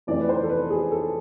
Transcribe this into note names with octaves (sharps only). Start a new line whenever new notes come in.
F2 E3 A3 C4 D5
B4
C5
A4
B4
G#4
A4